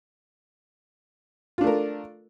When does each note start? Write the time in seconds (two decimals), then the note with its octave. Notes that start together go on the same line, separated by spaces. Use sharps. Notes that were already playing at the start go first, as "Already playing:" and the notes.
1.58 F4
1.61 D4
1.64 A3
1.67 A#4